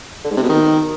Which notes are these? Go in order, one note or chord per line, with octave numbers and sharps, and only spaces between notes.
D3
G#2
C3
B2
D#3